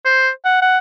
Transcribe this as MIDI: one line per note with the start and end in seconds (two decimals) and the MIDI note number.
0.05 0.30 72
0.45 0.60 78
0.61 0.78 78